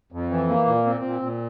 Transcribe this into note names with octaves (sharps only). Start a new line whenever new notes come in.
F2
E3
A#3
A#2
C4
A#2
A#2